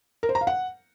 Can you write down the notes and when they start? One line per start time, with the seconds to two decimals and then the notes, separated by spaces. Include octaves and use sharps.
0.23 A#4
0.29 C5
0.35 A#5
0.41 F5
0.47 F#5